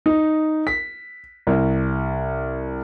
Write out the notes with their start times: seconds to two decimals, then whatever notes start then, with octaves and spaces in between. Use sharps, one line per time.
0.06 D#4
0.67 B6
1.47 C2